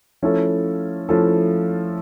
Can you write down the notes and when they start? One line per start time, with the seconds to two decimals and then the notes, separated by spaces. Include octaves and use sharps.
0.22 F3 A3 C#4 E4 A4
1.09 F3 A3 C#4 E4 A4